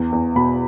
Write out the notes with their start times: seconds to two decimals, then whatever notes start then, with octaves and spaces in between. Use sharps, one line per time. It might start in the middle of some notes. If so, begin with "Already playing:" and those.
Already playing: E2
0.12 E2
0.36 B2 B5